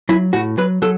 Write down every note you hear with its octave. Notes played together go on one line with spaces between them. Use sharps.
F#3 E4
A2 F#4
F#3 B4
F#3 A4